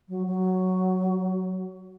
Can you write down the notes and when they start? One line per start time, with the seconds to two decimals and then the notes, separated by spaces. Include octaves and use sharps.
0.09 F#3
0.27 F#3